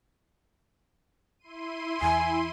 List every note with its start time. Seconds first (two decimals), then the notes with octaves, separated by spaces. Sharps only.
1.39 E4 C6 D#7
2.02 E2 G#5